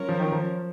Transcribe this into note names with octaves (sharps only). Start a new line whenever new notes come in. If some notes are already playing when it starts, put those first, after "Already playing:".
Already playing: F#3 C#4 F4 A#4 C#5
F3
D#3
F3